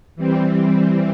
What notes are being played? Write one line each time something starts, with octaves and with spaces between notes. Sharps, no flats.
E3 G3 C4